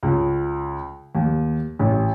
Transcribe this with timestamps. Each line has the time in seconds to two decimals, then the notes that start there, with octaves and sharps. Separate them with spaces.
0.03 C#2
1.15 D#2
1.79 A1